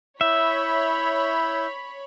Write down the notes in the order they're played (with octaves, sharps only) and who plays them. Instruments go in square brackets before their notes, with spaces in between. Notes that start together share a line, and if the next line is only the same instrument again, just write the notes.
[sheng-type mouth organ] E4 E6 G6 [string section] C#5 B5 [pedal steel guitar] E5